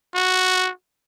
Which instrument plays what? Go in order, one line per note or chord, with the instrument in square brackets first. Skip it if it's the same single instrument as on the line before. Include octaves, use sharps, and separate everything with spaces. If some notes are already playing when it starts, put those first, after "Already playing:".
[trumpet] F#4